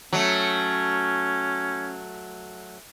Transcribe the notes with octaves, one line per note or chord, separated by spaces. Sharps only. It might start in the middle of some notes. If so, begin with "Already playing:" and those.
F#3 A3 C#4